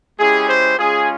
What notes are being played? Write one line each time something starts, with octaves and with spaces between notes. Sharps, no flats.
G#3 C#4 E4 G4 G#4
C5
G#3 C#4 F4 G#4